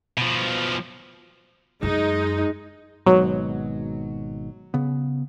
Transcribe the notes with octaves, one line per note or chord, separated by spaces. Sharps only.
B2 F3
F#2 G#3 D#4
G#1 G#2 B2 F#3
C#3 B3